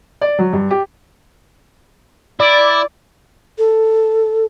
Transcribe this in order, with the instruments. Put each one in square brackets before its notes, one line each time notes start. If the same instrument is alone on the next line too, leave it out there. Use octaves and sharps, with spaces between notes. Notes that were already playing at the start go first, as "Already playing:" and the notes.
[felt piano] D5
F#3
G2
G4
[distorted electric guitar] E4 [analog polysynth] D5
[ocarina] A4